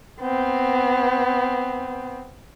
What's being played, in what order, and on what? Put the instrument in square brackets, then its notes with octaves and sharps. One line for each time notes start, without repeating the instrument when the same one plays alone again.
[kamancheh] B3 C4